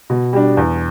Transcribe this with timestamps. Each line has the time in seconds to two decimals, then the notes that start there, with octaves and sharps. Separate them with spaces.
0.10 B2
0.33 G3 D4
0.57 E2